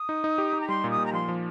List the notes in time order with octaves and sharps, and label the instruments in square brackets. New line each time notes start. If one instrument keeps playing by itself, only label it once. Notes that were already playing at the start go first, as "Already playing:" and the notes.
Already playing: [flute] D#6
[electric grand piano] D#4
D#4
G4
D#4
[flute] A#5
[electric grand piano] G3 [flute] C6
[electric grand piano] A#2
[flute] D#6
[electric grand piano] A#2
[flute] A#5
[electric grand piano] F3 [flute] C6
[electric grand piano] F3